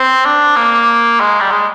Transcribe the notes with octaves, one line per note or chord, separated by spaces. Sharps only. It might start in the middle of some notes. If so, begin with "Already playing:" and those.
Already playing: C4
D4
A#3
G#3
G3
G#3